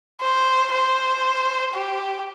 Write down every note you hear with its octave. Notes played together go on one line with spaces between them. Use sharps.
C5
C5
G4